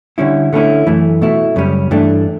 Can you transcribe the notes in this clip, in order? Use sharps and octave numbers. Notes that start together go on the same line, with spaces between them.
D3 G3 C#4 E4
D3 A3 C#4 E4
F#2 E3 A3
B2 A3 E4
F#2 C#3 G3 C#4
G2 E3 A3 D4